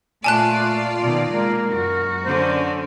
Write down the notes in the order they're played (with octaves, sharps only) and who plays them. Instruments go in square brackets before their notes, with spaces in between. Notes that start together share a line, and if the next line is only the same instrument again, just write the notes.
[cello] A#2 [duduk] A3 [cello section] F4 D5 [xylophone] G#5 A5 F#6
[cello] B2 D#3
[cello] G#3 A#3 [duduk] A#4
[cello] F#2 F#4
[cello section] D3 C#4 [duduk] C5